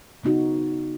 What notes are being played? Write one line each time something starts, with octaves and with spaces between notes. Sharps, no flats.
C#3 B3 D#4 F#4